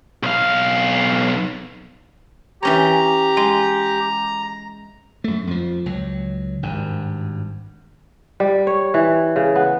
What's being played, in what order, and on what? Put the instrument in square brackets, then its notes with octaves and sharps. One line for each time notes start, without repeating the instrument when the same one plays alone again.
[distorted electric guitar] B1 F5
[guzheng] E3 C#4 C#5 [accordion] G4 [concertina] A#5
[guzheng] G#3
[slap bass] F#2 A3
F2 F3
C#2 F#3
G#1 G2
[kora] G3
C#5
E3
C#3
B3